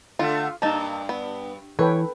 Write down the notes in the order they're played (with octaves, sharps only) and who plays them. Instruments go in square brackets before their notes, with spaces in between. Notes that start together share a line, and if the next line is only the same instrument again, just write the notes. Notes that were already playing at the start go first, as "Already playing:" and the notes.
[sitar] D3 A3 [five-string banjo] F4
[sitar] G2 [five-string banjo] A#3 D#4 [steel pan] A5
[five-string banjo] B3
[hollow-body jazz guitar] E3 [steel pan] A4 B4 G5 [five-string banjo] C#5